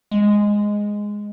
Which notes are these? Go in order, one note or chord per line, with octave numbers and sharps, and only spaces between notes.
G#3